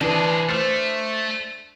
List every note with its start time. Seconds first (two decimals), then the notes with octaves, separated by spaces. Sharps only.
0.01 C3 E3 D4 G#4 B4
0.49 A3 C5 F6